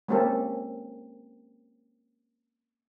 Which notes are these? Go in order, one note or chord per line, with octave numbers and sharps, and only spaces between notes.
G#3 A#3 C4 C#4 G4 A4